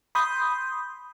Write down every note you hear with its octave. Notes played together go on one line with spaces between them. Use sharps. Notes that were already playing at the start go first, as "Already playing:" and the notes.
B5 C6 D#6 G6